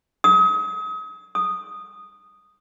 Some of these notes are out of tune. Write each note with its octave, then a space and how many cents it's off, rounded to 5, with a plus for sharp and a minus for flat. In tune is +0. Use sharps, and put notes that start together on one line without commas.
D#6 +35
D#6 -10